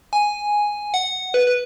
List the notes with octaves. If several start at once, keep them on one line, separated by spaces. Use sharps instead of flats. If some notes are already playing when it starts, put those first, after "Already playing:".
G#5
F#5
B4
B4